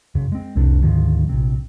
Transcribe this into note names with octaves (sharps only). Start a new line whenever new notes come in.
F#2 C#3
G#3 C4
C2 F2 C3 D4
D2 G#2 D#3 F3
A#1 C3